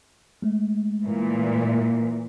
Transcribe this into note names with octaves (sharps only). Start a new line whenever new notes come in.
G#3 A3
A#2 E3